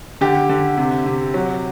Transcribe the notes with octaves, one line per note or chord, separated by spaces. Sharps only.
D3 G4
D3
C3
C3
F#3